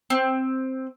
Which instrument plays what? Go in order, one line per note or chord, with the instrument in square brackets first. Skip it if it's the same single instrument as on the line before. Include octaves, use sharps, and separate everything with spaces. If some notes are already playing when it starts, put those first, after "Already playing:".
[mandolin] C4